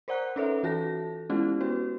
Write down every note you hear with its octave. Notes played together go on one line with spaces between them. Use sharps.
A#4 C5 D5 F#5 A#5 F#6
C#4 D#4 A4 B4 C#5 E5
E3 F4 F#4 A4 A5 A#6
G#3 B3 C#4 E4 F4 G4
B3 F#4 B4